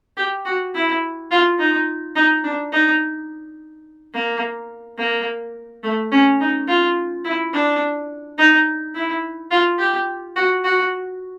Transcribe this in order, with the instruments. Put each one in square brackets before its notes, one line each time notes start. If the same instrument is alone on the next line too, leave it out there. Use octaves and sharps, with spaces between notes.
[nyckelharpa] G4
F#4
E4
F4
D#4
D#4
D4
D#4
A#3
A#3
A3
C#4
D#4
F4
E4
D4
D#4
E4
F4
G4
F#4
F#4